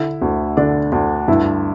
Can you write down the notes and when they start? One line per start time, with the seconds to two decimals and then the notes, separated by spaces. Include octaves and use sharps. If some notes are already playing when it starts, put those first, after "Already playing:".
Already playing: D3 E4
0.21 D2
0.57 D3 D4
0.92 D2
1.28 G2 E4